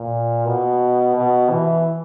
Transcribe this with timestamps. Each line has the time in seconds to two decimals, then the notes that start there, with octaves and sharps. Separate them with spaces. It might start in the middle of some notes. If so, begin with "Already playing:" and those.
Already playing: A#2
0.46 B2
1.16 B2
1.50 E3